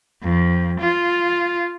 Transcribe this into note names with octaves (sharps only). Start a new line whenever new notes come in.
F2
F4